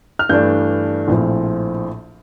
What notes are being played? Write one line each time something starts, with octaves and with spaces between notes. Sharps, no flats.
F6
G2 E3 A3 D4 G6
A#1 A2 F3 C4